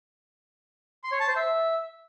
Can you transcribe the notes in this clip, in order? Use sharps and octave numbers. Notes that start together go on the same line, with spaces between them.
C6
C#5
A5
C5
E5